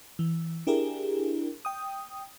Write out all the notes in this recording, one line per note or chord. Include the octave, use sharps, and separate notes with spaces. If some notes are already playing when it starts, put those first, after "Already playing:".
E3
D4 E4 G4 G#4 A#4
G5 D#6